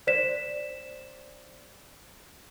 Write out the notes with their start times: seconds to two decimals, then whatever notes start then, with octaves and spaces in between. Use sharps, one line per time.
0.07 C5 D5 B6 E7